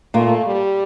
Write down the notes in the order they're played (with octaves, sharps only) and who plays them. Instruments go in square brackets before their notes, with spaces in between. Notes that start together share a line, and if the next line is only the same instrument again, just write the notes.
[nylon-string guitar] A#2 A#3 [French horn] A3
[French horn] G3